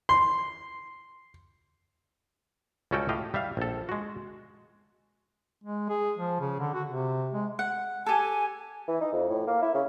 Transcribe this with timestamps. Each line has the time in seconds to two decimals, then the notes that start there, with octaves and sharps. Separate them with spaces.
0.09 C6
2.91 C#2 G3 C#4 F#4 A4 G5
3.09 A2 G4 D#5 F5
3.34 G3 E5 F5
3.57 A#1 A4
3.89 G#3 F#4
5.64 G#3
5.89 G#4
6.18 F3
6.40 C#3
6.59 D3
6.74 F#4
6.89 C3
7.33 G#3
7.59 F#5
8.06 G4 A4 G#5
8.88 E3
9.01 D#4
9.12 F2
9.29 A2
9.47 A#3
9.62 E4
9.74 C#3